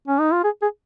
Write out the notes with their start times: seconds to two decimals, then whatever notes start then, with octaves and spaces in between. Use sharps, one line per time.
0.08 C#4
0.20 D#4
0.32 F4
0.44 G#4
0.62 G#4